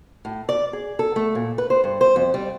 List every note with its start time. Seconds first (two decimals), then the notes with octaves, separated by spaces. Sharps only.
0.25 A2
0.49 D5
0.73 G#4
0.99 A4
1.16 A3
1.35 A#2
1.58 B4
1.70 C5
1.84 G2
2.01 C5
2.16 F2
2.34 G3